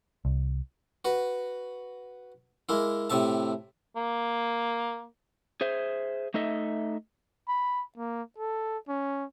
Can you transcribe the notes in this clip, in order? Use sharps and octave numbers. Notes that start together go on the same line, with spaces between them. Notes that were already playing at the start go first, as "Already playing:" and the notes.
C2
F#4 B4
G#3 A#3 E4
A2 C3 E5 A5
A#3
G#4 C5 E5
A3 D#4 A4 D#5 E5
B5
A#3
A4
C#4